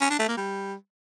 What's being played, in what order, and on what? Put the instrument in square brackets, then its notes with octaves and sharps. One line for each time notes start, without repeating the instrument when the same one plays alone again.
[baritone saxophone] C#4
D4
A3
A#3
G3